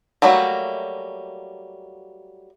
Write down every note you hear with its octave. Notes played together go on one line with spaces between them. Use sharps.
F#3 G3 A3 A#3 F#4